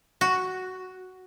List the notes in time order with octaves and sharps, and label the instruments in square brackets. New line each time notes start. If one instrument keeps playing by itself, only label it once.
[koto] F#4